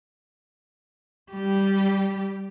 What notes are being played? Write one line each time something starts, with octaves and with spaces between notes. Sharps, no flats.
G3 G4